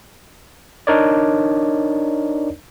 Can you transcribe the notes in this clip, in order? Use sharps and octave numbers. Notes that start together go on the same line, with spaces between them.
D4 D#4 A#4 C#5 D5